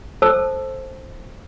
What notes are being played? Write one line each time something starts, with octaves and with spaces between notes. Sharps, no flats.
A4 C5 A5 E6